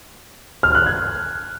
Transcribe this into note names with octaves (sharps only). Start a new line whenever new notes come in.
F6
F#6
G#6